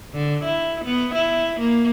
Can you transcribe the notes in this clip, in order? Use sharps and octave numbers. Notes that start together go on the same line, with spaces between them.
D3
E4
B3
E4
A#3